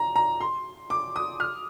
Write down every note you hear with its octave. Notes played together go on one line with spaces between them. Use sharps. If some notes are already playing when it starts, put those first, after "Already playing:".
Already playing: A#5
A#5
C6
D6
D#6
F6